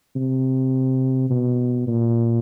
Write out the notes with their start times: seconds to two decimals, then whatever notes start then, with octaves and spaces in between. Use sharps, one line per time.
0.16 C3
1.30 B2
1.88 A#2